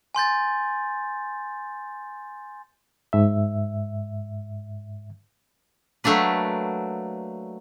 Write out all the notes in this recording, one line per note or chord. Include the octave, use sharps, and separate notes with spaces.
G#5 C6 G6 A6
G#2 E5
F#3 A3 A#3 D4 B4